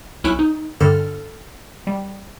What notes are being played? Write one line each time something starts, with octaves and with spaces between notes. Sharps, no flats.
B1 C#4 E4 B5 F#6 D7
D#4
G2 D3 A4 F6
G3